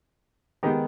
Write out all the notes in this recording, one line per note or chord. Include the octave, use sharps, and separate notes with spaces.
D#3 G#3 B3 D#4 G4